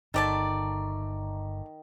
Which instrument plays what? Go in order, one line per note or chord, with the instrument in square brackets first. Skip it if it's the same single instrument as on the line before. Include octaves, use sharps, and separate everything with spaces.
[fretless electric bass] G1 [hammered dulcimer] D#3 [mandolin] A3 D5 A5